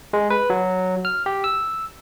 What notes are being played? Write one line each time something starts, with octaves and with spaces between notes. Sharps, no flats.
G#3
B4
F#3
F6
G4
E6